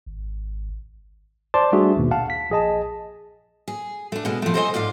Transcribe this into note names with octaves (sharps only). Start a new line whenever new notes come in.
G#1
C5 D5 A5 C6 D6
G3 A3 D4 F#4 G#4 E5
G#1 D#2 B2
F5 F#5 A5
B6
A#1 G#4 D#5 A5
G#4
A3 D4
B2 G#3
F3 A3
A4 A#4 C5 D5 D#5 G#5
G#2 F4 D5 F5